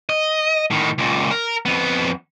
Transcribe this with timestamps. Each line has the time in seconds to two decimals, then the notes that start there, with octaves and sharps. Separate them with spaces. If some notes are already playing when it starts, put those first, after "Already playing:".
0.09 D#5
0.70 A2 D#3
0.98 C#2 A#2
1.31 A#4
1.65 F2 B3